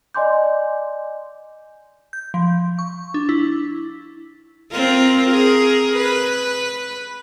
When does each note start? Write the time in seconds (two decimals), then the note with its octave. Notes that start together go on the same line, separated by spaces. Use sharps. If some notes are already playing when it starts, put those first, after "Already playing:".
0.15 D5 D#5 G#5 C6 D6 G6
2.13 G6
2.34 F3
2.79 C#6
3.14 D4
3.29 E4
4.72 C4 F4 A#4
5.28 G#4 A#4
5.97 B4